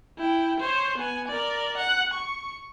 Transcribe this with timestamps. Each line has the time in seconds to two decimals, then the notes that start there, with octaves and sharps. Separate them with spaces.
0.18 E4 G5
0.60 C5 C#5
0.98 B3 G#5
1.28 A#4 D5
1.77 F#5
2.14 C#6